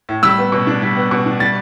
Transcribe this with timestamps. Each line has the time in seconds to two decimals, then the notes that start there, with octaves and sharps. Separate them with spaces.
0.09 A2
0.23 G3 E6
0.38 B3
0.52 B2
0.67 D4
0.82 G3
0.96 B3
1.11 B2
1.26 D4
1.40 G3 A6